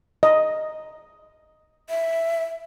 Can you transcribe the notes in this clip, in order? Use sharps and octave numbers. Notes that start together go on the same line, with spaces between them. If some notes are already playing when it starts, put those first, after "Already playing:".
D#5
E5